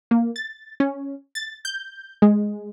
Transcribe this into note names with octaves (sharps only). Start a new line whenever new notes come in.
A#3
A6
C#4
A6
G6
G#3